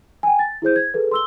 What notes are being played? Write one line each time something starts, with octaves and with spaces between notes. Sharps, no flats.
G5 G#5
A6
E4 G#4 C5 G6
G#6
G#4 A4 B4
C6 E6 G7